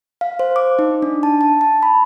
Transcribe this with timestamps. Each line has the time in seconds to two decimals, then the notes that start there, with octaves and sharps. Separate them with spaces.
0.21 F5
0.39 C5
0.56 D6
0.79 D#4
1.02 D4
1.23 A5
1.41 A5
1.61 A5
1.83 B5